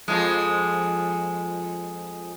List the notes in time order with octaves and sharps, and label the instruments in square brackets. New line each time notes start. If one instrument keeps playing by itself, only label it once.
[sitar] F2 F3 G#3